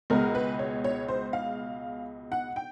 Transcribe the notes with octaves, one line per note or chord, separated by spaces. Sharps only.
C#2 B2 G#3 B3 A#4
B4
C#5
C#5
C5
F5
F#5
G5